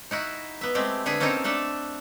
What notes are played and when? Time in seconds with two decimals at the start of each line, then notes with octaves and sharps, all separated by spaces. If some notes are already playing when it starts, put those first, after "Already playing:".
0.11 D#4 E4 F#4
0.61 B3 E5
0.75 G#3 A3 C4 G4
1.06 D3 B3 G#4 E5 G#5
1.20 A#3 C4 C#4 D#4 A4 A#4
1.44 A3 D4 A4 E5